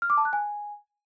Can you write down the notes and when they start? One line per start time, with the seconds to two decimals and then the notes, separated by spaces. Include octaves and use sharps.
0.02 F6
0.10 D6
0.17 A5
0.25 F#6
0.33 G#5